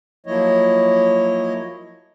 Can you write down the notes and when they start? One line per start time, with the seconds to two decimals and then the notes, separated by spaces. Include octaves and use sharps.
0.26 F3 F#3 A#3 E4 C#5 D#5